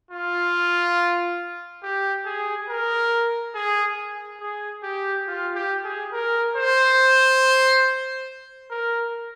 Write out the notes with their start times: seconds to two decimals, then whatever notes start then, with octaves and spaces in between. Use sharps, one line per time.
0.11 F4
1.83 G4
2.25 G#4
2.69 A#4
3.55 G#4
4.41 G#4
4.84 G4
5.27 F4
5.55 G4
5.84 G#4
6.13 A#4
6.56 C5
8.71 A#4